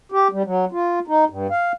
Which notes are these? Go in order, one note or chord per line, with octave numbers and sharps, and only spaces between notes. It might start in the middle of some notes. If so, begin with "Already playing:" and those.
G4
G3
F#3
F4
D#4
G2
F5